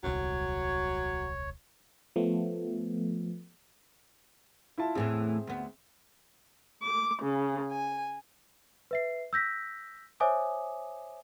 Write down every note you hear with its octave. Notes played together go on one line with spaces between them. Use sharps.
D#1 C2 F#3 C#5
F3 A3 B3
E4 F4 A5
E2 A2 E3 C4 G#4 E5
D2 B3
D6
C#3
G#5
B4 E5 C7
E6 G6 A#6 B6
C5 C#5 E5 G#5 D6 D#6